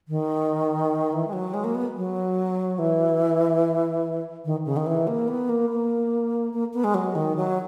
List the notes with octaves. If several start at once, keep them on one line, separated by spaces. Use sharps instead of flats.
D#3
E3
G#3
F#3
G#3
A#3
B3
F#3
E3
D#3
C#3
D#3
E3
A#3
B3
A#3
A#3
A#3
B3
G#3
F#3
D#3
F#3